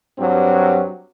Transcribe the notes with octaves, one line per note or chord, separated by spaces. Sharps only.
G2 F#3 C4